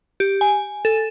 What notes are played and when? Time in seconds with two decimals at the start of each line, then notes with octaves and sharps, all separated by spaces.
0.20 G4
0.41 G#5
0.85 A4